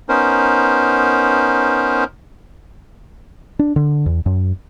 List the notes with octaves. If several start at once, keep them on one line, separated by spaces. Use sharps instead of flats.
B3 C#4 D#4 A#4 C5
D4
D3
E2
F#2